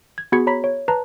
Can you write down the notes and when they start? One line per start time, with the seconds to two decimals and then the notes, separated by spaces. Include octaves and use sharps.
0.18 G#6
0.32 B3 F#4 G#4 B5 G#6 C#7
0.47 C#5 A#5 B5 B6
0.64 C#5
0.88 B4 A5 A#5